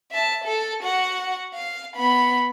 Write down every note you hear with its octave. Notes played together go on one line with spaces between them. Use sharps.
E5 A5
A4
F#4 F#5
F5
B3 B5